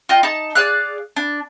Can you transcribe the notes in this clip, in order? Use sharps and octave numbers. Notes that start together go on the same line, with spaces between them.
F4 D#5 G5
D#4 A5
G#4 D5 F5 F#6
D4